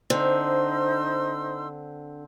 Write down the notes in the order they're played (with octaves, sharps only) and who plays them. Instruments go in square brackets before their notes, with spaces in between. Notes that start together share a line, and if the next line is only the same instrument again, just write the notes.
[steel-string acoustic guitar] D3 [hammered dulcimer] C4 [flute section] D#4 C6 E6 [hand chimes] C5